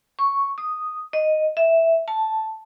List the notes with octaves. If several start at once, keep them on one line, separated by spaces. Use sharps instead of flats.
C#6
D#6
D#5
E5
A5